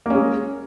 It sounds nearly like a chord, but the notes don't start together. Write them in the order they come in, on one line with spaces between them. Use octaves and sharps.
A#3 C#4 G#3